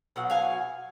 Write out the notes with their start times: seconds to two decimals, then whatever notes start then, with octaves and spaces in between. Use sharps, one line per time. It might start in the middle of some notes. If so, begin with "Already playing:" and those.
0.16 B2 F#3 F#5
0.30 F5 G#5